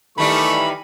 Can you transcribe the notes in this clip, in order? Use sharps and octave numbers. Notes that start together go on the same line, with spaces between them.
D#3 E3 G3 A3 D#4 B5 C#6